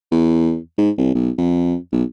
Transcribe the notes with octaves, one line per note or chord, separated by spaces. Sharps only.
E2
G#2
C2
B1
F2
B1